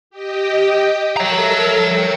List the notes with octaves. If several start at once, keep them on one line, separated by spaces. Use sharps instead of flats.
G4 D#5 G5
A4 A#4 C#5 E5 A#5
G5 C#7